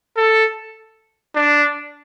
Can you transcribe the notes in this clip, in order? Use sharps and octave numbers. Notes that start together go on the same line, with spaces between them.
A4
D4